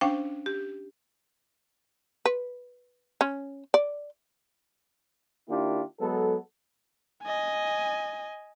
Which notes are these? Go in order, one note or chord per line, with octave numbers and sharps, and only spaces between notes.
C#4 D4 C5 F5 G5
G4
B4
C#4
D5
D#3 A#3 D4 E4 F4 G4
F#3 G#3 B3 A4
D#5 G#5